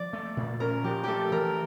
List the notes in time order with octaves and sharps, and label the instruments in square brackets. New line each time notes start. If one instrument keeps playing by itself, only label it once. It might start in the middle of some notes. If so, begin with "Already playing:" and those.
Already playing: [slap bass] F3 [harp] D5
[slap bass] A3
A#2
[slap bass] C#4 [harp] A#4
[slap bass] F3 [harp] G4
[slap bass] A3 [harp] G4 A4
[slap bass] E3 [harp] A#4